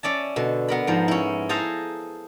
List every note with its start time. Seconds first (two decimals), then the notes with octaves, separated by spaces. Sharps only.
0.03 C#4 D5 E5 A5
0.36 B2 D3
0.68 B3 A#4 B5
0.87 G#2 F3
1.08 C#4 E4
1.49 G#4 A4 C5 F5 G#5 A#5